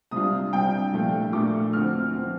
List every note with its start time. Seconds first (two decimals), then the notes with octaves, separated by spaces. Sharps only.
0.11 C3 G3 D4 F4 D#6
0.52 C3 G3 D4 F4 G5
0.93 A#2 F3 A3 D4 F4
1.33 A#2 F3 A3 D4 F4 D6
1.73 D2 D3 F3 C4 F6
2.14 D3 F3 C4